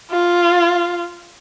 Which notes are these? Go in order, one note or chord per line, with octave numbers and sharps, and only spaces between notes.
F4